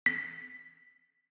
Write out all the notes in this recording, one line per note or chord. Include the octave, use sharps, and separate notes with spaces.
B6